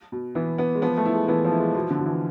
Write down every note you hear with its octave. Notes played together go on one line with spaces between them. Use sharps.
B2
E3 B3
B3
G#3
F3 B3
A3
E4
G#3
E3 B3
F3
E4
G#3
B2 F3
D3
B2
E3